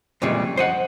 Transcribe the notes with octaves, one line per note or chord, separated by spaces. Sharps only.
F2 A#2 C#3 E3 G3 G#3
C5 D#5 F#5